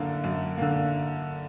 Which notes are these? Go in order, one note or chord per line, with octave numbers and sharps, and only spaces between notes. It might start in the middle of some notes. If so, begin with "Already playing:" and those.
Already playing: F#2 D3 A#3
F#2
D3 A#3